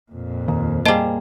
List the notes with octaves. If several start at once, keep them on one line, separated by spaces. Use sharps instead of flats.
F2 A#2
D#2
G3 A#3 G#4 C5 D#5 A5